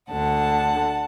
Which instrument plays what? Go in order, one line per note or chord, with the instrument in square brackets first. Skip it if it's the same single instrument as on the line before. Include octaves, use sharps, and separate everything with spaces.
[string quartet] D2 D3 F#5 A5